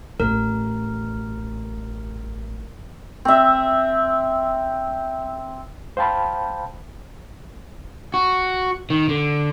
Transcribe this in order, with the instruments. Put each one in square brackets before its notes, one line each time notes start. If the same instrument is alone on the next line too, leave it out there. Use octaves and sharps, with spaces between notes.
[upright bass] A1 [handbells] A#4
[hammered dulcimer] C4 E5
[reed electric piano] C5 F5 G5 A5 B5
[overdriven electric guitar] F#4
D#3
D3